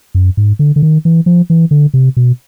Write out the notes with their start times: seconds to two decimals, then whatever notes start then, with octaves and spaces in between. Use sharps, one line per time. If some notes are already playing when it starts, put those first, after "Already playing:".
0.15 F#2
0.37 G#2
0.59 D3
0.76 D3
0.83 D#3
1.05 E3
1.26 F3
1.50 E3
1.71 D3
1.94 C3
2.17 B2